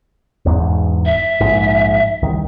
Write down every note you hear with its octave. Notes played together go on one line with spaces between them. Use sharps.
E1 E2 G#2
E5
A#1 G#2
C2 D#3